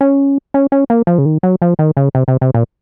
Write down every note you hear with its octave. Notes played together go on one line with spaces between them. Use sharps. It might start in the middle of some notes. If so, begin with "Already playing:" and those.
C#4
C#4
C#4
A#3
F3
C#3
D#3
F#3
F3
D#3
C#3
C3
C3
C3
A#2